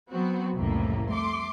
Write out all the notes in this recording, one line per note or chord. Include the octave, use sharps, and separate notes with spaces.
F#3 B3 C4 F#4
C2 F2 A2 C#3 A#3
A3 C6 D6